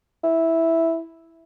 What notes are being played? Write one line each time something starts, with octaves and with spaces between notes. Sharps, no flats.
E4